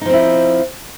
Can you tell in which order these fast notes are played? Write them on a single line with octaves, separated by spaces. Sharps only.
D#4 F3 C4 E4